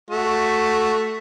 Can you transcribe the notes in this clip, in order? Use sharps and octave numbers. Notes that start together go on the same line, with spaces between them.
A3 F#4